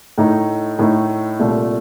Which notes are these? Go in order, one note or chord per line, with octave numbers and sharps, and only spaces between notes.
A2 A3 D#4
A2 A3 D#4
C2 A#2 A3